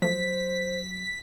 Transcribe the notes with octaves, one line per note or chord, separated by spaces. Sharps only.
F3 F#3 A3 C5 B6